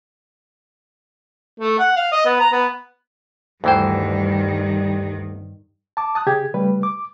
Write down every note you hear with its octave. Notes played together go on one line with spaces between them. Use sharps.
A3
F#5
F5
D#5
B3
A#5
B3
D2 G2 D#3 E3 G3 D#4 C5 G5
A5 D6
A5 D#6 F#6
C#3 G4 G#4 G#6
C#3 G3 A3 B4
D6